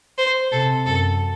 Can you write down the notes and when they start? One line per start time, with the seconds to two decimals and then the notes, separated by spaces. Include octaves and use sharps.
0.18 C5
0.52 C3 A4
0.86 F#2 A4